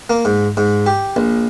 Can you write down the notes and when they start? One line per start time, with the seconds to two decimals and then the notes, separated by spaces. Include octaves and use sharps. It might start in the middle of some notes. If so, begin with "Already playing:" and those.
0.10 A#3
0.25 G#2
0.57 G#2
0.86 G4
1.16 A#1